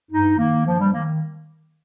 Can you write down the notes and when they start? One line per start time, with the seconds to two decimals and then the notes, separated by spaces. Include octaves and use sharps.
0.11 G2 D#4
0.37 D#3 A#3
0.65 G2 F3
0.78 G3
0.92 D#3 A#3